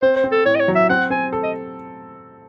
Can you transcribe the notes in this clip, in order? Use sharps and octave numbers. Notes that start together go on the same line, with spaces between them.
C4 C5
C5
C4
A4
A2 C#5
D#5
C#5
F#3
E5
C4 F#5
C4 G#5
A4
D#5